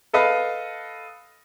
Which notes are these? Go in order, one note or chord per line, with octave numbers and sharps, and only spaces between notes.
A4 B4 D#5 F5